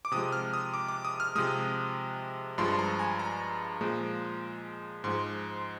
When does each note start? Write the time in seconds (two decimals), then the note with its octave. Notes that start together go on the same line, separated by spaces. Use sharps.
0.05 D6
0.12 C3 F3 G#3 D#6
0.32 F6
0.53 D#6
0.74 D6
0.88 D6
1.05 D#6
1.20 F6
1.35 C3 F3 G#3 D#6
2.58 G2 F3 G#3 C6
2.79 A#5
2.99 G#5
3.19 A#5
3.81 A#2 F3 G#3
5.04 G#2 F3 G#3 C6